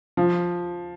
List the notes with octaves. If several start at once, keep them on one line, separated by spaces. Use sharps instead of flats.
F3